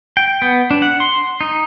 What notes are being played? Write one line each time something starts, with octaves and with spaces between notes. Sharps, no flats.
G5
B3
D4
F#5
C6
D#4